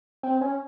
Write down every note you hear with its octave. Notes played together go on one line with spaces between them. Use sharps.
C4
C#4